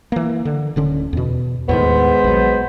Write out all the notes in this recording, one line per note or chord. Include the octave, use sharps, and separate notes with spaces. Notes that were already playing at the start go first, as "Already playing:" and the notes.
E3 A#3
D3
D1 D3 C#4
E2 B2
D#2 A2 D#3 G#3 B3 C5
A#1 F#3